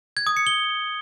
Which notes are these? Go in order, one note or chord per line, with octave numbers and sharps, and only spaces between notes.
G#6
D#6
C#7
G7